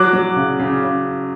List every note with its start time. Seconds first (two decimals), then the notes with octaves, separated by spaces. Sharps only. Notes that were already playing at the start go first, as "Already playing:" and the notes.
Already playing: F#3 D6 F#6
0.13 F#3
0.36 C#3
0.59 C#3
0.83 C#3